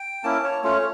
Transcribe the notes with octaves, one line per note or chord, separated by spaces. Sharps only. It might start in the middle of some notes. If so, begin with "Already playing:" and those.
Already playing: G5
A#3 C#4 E4 A5
C#5
A3 C#4 F4 C#5